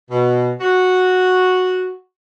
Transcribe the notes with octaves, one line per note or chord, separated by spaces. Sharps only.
B2
F#4